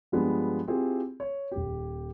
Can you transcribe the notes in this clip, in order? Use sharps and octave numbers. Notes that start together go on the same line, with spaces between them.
G2 F3 G3 G#3 B3
C4 E4 F4 G4 G#4
C#5
D#1 G4